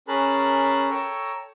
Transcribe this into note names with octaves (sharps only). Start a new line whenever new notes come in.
C#4 G#4 A#4 A5 B5 F#6
A4 C#5 G5 A#5 E6